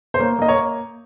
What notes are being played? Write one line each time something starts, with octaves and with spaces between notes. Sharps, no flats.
C5
A#3 C#5
A#3 D#5
C#5